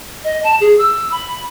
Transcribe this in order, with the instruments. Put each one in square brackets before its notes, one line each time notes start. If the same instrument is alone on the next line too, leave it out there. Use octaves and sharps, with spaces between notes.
[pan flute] D#5
A5
G#4
E6
B5